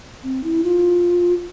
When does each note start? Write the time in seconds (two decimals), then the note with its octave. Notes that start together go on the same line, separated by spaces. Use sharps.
0.24 C4
0.44 E4
0.64 F4